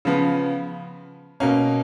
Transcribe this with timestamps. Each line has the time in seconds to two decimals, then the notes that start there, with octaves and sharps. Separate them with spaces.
0.05 C#3 F3 B3
1.40 B2 A#3 C#4